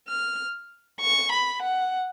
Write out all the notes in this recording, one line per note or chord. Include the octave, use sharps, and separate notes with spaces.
F6
C#6
B5
F#5